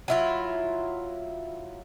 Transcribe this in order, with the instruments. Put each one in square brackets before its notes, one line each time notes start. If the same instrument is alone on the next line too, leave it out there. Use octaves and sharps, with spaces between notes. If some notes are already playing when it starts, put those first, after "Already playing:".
[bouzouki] F#3 E4 F4